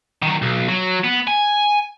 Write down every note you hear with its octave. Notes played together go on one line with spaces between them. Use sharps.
D#3 F#3
B1
F#3
B3
G#5